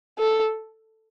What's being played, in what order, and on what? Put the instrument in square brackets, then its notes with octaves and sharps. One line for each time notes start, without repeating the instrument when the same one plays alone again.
[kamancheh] A4